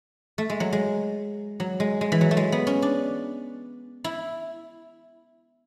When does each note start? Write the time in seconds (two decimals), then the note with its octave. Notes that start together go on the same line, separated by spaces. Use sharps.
0.38 A3
0.50 G#3
0.60 F#3
0.72 G#3
1.60 F#3
1.80 G#3
2.01 G#3
2.12 E3
2.21 F#3
2.31 A3
2.37 G#3
2.52 B3
2.67 C#4
2.82 D4
4.04 E4